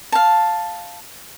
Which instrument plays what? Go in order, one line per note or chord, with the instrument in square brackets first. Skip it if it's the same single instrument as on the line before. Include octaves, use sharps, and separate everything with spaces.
[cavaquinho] F5 A5